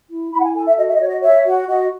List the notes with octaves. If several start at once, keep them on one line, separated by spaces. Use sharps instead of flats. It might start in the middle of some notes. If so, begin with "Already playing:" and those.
E4
E4 B5
F#5
G#5
A4 G#5
E5
F#4 D#5
E5
D#5
F#4 C#5
D#5
C#5 E5
F#4
F#4 D#5